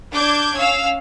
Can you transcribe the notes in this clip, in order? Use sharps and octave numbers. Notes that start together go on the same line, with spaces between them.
D4 D6 G6 G#6
C#4 F5 E6